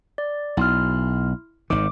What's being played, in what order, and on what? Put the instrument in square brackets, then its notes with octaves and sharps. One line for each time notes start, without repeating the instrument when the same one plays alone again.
[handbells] D5
[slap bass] B1 [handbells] E4 C6 F6
[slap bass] G#1 D#3 [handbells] D6